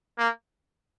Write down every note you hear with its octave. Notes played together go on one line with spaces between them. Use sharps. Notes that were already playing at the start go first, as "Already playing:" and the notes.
A#3